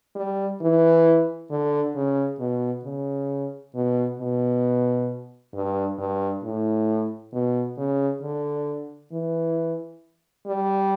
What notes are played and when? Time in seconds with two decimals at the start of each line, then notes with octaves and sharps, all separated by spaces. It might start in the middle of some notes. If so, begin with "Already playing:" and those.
0.16 G3
0.61 E3
1.50 D3
1.95 C#3
2.40 B2
2.84 C#3
3.74 B2
4.20 B2
5.54 G2
5.99 G2
6.43 A2
7.33 B2
7.78 C#3
8.22 D3
9.12 E3
10.47 G3